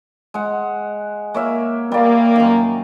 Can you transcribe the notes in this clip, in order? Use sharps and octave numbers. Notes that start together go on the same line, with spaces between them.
G#3 F#5
A#3 C#5 E5
G3 A#3 D5
F#2 D#3